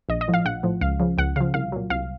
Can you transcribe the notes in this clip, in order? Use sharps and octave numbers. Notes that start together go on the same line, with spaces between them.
A#1 D#5
D#5
A2 F3
F5
A#1 F#5
A2 F3
C#2 F5
C#3 F3
C#2 F#5
C#3 F3 F5
C2 F5
A#2 F#3
C2 F5